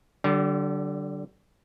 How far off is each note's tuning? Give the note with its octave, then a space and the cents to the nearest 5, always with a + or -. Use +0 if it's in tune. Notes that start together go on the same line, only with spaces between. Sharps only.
D3 +0 G3 -40